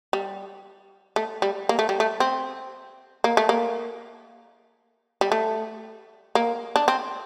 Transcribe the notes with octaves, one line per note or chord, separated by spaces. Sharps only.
G3
A3
G3
A#3
A3
G3
A3
C4
A#3
A3
A#3
G3
A3
A#3
D4
C4